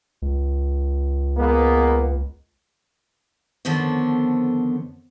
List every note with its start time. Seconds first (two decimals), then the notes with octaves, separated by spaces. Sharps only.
0.22 C#2
1.37 G#3 A#3 B3
3.65 F2 D3 D#3 B3 C5 C#5